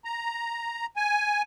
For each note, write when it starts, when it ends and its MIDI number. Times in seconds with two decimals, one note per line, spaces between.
0.05 0.86 82
0.96 1.42 80